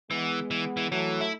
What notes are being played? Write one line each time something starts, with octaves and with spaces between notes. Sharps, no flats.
E3 G#3 B3
E3
E3
E3 F#3 A3
E4